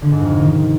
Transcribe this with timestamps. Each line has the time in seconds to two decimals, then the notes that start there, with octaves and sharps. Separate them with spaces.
0.02 D3
0.11 G#2
0.21 F2
0.31 C3
0.40 D#3